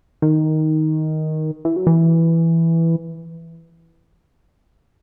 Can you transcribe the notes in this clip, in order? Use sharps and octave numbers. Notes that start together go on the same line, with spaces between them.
D#3
E3
F#3
E3